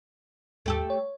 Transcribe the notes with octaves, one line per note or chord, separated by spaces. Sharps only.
D#2 A3 G4 A4
C#5